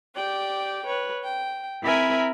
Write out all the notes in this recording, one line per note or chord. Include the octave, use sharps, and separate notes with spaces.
G4 D5 G5
B4 C#5
G5
C4 E4 A#4 E5 G#5 B5